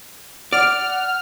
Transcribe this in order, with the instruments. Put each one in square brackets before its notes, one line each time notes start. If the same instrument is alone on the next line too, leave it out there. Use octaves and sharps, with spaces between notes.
[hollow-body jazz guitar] D5 [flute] F#5 [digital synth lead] F6